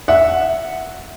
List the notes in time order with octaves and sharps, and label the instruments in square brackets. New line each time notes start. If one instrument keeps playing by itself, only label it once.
[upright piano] E5 F#5